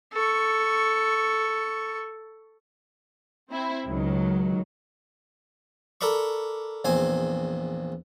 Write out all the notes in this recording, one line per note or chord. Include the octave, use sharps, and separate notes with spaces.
A4 C#6
C4 E4
C#2 D#3 F#3
A4 A#4 D5 B5 C#6
A#1 E2 C4 G#5